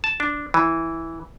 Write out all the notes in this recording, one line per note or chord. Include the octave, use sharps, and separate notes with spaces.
A5
D4
E3